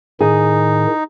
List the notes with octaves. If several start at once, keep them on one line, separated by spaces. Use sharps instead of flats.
A2 D#3 D#4 G#4